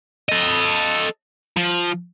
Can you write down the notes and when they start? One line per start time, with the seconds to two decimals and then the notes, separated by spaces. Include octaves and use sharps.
0.29 A4 D#5
1.57 F3